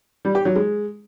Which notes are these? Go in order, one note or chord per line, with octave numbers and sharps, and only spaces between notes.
G3
G4
F#3
G#3